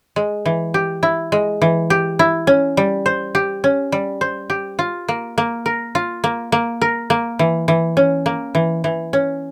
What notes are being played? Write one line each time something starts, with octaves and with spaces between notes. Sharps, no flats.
G#3
E3
G4
E4
G#3
E3
G4
E4
C#4
G3
C5
G4
C#4
G3
C5
G4
F4
A#3
A#3
A#4
F4
A#3
A#3
A#4
A#3
E3
E3
C#4
A#3
E3
E3
C#4